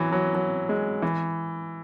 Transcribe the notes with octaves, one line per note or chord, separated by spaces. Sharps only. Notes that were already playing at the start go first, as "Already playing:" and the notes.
Already playing: E3 F#3
F#3
F#3
G#3
E3